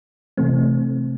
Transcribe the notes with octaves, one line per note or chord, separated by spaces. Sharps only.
C3 E3 A3 C4